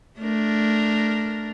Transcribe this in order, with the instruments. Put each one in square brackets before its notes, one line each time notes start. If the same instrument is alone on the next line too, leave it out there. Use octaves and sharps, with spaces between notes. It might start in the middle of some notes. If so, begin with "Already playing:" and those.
[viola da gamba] A3 D4 A#4